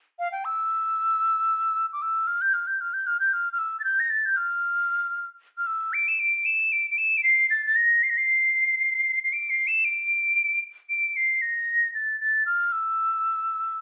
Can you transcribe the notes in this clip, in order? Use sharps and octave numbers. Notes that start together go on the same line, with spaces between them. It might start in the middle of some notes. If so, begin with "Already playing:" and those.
F5
G5
E6
D6
E6
F6
G6
F6
G6
F6
G6
F6
G6
F6
F6
E6
A6
G6
A#6
A6
G6
F6
F6
E6
D7
E7
D7
E7
D7
D7
E7
D7
C7
A6
A6
A#6
C7
A#6
C7
C7
D7
C7
E7
D7
D7
C7
A#6
A6
A6
F6
E6